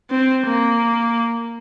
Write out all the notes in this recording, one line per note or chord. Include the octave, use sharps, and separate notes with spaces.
C4
A#3